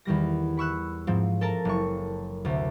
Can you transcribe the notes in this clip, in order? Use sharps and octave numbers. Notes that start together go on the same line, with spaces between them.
E2 D#3 G3 A#6
B5 C#6 E6 F#6
G#2 F3 C4
A4 A#4 A5 A#5
F#1 C#6
D2 C3